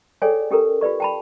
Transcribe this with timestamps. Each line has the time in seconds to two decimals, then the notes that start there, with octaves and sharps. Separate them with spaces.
0.22 G#4 A4 C#5 D5 G5 G#5
0.51 C#4 G4 A4 A#4
0.81 F4 G4 B4 D5 C#6
1.00 G5 A5 B5